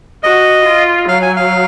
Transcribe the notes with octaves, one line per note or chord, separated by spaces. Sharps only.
F#4 D#5
F4
F#3 F5
G#5
F5